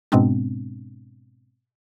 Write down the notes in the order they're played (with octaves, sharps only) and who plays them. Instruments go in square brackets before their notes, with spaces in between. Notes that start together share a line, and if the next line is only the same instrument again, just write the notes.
[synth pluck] G#2 B2 G#3 B3 C4 D4